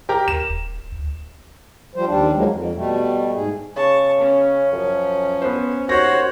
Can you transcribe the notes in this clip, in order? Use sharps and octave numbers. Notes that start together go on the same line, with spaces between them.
G4 A#4 G5
D#2 E7
D#1
D2
F3 G3 C5
D#2 G3 D4
F3 F#3 G#3 A#3
F2
B2 G3 A3
G#2 G#4
C#3 A5 C#6
C#4
F#2 F3
B3 B4 C5
D#2 F#4 C5 C#5 F#5 A#6